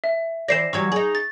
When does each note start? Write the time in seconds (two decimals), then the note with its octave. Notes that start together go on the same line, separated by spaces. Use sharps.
0.04 E5
0.48 E3 C5 D5 A#6 C7 E7
0.73 E3 F#3 G3 C#6 G#6
0.92 D#4 G#4
1.15 A6